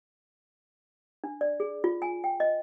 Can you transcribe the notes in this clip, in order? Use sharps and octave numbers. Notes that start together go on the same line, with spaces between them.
D4
D5
G#4
F4
G#5
G5
D#5